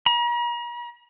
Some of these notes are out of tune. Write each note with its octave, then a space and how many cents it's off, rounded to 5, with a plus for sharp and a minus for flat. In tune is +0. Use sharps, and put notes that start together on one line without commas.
A#5 +45